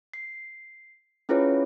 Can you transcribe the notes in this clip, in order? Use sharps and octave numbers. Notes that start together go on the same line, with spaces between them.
C7
C#4 E4 F4 G#4 B4 C#5